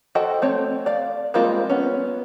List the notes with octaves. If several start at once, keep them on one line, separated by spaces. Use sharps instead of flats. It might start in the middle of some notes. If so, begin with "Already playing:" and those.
F#4 A4 C5 D#5 G5
A3 C4 C#5
D5 F5
G3 G#3 A#3 C4 F4
B3 C#4